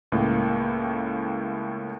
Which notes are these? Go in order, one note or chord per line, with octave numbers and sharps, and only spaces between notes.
C#2 A2 A#3